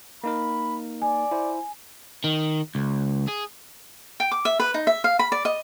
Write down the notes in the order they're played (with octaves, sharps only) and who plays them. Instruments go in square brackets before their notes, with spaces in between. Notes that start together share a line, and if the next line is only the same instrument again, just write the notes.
[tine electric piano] A#3 D#4 A#4 [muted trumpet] B5
[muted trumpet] D5 [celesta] G#5
[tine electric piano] E4 C5
[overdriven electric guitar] D#3
C#2
G#4
[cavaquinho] G5
D6
E5
B4
D#4
E5
F5
B5
D5
D#5